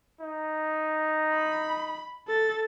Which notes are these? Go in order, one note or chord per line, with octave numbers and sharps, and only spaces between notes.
D#4
B5
A4 A6